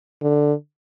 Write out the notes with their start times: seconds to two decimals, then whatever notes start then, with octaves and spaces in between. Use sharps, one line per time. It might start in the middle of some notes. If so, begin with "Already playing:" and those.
0.21 D3